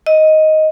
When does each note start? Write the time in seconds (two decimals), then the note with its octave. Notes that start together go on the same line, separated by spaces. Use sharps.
0.06 D#5